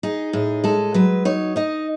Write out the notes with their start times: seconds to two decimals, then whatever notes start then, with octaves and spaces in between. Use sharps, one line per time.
0.03 D#4 G#4
0.33 A2 G#4
0.64 G#3 A4
0.94 F#3 B4
1.25 D#4 C#5
1.56 D#4 D#5